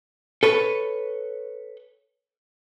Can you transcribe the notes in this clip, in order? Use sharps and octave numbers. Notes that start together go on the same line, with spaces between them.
A4 B4 C#5